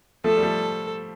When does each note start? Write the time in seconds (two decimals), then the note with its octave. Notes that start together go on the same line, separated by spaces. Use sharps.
0.24 F3 A3 A4
0.37 G3
0.43 F3 A3